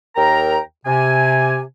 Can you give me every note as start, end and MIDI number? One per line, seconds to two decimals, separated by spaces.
0.16 0.58 39
0.16 0.58 70
0.16 0.58 79
0.16 0.58 82
0.86 1.61 48
0.86 1.61 80